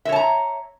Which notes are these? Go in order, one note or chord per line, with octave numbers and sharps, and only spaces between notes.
C#5 E5 A5 A#5